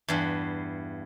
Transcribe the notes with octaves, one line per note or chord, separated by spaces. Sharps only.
E2 G2